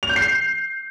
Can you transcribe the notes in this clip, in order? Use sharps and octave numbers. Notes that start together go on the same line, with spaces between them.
F7
G6
C7